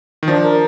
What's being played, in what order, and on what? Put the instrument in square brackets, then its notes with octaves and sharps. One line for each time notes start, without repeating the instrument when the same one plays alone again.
[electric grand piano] D#3
[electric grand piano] F3 [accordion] D4
[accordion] A#4